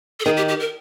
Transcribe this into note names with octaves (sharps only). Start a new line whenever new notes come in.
A4
D#3 G#4
G4
G4
A#4